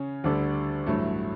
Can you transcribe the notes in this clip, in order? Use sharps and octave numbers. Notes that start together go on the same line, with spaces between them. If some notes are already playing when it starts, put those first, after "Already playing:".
Already playing: C#3 C#4
D2 D3 G3 D4 A4
A1 G2 F#3 A3